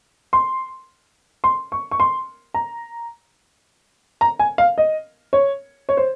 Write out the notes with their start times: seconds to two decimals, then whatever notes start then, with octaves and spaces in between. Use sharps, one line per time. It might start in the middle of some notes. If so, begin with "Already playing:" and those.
0.33 C6
1.44 C6
1.72 C#6
1.91 C#6
2.00 C6
2.54 A#5
4.21 A#5
4.39 G#5
4.58 F5
4.78 D#5
5.33 C#5
5.89 C#5
5.97 C5